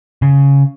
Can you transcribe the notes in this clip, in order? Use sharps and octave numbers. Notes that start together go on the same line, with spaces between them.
C#3